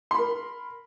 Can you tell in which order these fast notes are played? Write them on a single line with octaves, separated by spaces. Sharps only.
C6 B5 A#4